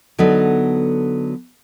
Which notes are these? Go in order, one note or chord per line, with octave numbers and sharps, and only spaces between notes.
D3 F#3 B3 D#4 A4 B4